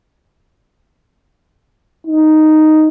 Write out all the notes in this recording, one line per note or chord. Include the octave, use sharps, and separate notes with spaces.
D#4